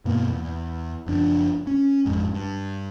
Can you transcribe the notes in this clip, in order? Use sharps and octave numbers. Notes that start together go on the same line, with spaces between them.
G2 B2 A#3 B3
E2
F#1 F3 D4
C#4
A1 F2 G#2
G2